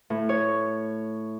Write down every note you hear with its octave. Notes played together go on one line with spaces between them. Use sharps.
A2
C#5